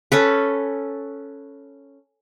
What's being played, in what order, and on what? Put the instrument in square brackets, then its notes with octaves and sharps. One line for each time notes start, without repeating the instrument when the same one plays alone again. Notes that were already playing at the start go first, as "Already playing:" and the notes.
[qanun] C#4 A4 B4